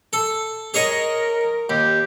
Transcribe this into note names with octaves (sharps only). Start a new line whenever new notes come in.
A4
G#4 A#4 C#5 D#5
D#2 G4